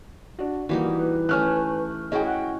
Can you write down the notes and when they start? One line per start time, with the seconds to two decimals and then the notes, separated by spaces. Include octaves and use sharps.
0.39 D4 F#4
0.69 E3 G3 A#3 D#4 F#4
0.98 B4
1.29 A3 C#4 G4 G#5 F6 F#6
2.12 C#4 E4 F#4 G#4 D#5 G5
2.25 F#5